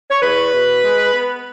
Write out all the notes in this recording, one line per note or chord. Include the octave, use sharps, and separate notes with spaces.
C#5
E2 B4
B2
G#3
B3